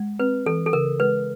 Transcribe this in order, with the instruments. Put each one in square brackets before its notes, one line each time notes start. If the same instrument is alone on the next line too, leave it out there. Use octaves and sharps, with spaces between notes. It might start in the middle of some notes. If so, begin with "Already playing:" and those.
Already playing: [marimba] G#3
[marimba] C4 [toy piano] B4
[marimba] E3 [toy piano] A4
[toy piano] A4
[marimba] C#3 [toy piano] A#4
[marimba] G#3 [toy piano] B4